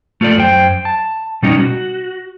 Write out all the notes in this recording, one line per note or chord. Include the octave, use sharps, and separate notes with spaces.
A3 F4 A4 D5
F#2 C5 G5
A5
B2 G3 C#4 D#4
F#4